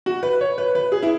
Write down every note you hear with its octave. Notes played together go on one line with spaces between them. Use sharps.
F#4
B4
C#5
B4
B4
G#4
E4